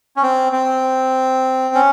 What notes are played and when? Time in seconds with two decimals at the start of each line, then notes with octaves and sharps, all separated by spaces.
0.16 C#4
0.23 C4
0.53 C4
1.75 C#4